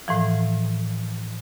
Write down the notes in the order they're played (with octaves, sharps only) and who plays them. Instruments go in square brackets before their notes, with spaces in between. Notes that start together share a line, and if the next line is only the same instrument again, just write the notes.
[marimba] A2 E3 F3